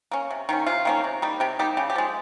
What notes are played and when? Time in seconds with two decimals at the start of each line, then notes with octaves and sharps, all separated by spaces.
0.11 A#3 C#4
0.30 C3
0.49 D#3 A#3 C#4
0.67 C3 F4
0.85 D#3 A#3 C#4
1.04 C3
1.22 G3 A#3 D#4
1.40 C3 G4
1.59 G3 A#3 D#4 G4
1.77 C#3 G4
1.90 G4
1.96 F3 G#3